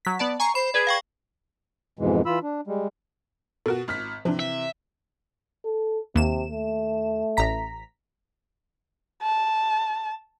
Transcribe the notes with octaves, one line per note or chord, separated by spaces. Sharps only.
F#3 B6
B3 D5 A5
G#5 A#5 C#6 C7
C5 B5 C7
G#4 B4 D5 G#6
F5 G5 C#6
F2 G#2 B2 E3 G#3
E3 F4 B5 E6
D4
G3 G#3
B2 F#4 A4 A#4
G#1 F6 B6
C3 E3 F3 D4
E5
A4
D#2 C3 E7
A3
A1 A#5 B6
A5